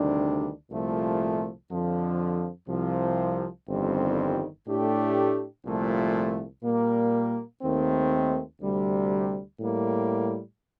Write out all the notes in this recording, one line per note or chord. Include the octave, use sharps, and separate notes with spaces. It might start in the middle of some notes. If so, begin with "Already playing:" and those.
Already playing: D2 C3 D#3 G3 D4
C2 A#2 F3 A3
F2 D3 F3
C2 C3 F3
G1 F2 D#3 G3 C4
A2 A3 D4 G4
C2 A#2 F3 A3
A#2 G3 A#3
D#2 D#3 A3 C4
D2 C3 G3
A2 G3 A#3